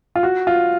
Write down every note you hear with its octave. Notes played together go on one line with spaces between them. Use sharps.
F4
F#4
F4